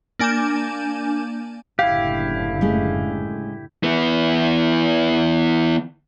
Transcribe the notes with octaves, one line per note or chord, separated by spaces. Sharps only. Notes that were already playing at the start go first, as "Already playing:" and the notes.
A#3 D4 G#5 D6 G6 E7
F#1 A2 D3 E4 G4 F5
G#3 A3 C#4
E3 B3